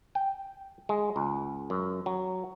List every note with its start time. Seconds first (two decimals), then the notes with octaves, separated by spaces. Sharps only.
0.15 G5
0.89 G#3
1.16 C#2
1.70 F#2
2.06 F#3